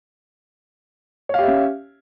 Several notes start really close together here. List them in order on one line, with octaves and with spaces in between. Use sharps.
C#5 F5 G4 E5 C#4